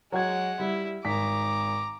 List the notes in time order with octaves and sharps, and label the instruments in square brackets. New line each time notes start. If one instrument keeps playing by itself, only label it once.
[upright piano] F#3 F#4 G#6 [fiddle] G#3 F#5
[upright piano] G3 [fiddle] E4
[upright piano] G#1 B6 [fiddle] A#5 D6